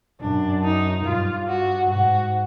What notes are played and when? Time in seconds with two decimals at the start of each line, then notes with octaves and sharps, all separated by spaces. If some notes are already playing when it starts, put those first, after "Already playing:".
0.21 F#2 D4
0.64 D#4
1.05 G2 F4
1.48 F#4
1.90 G#2 F#4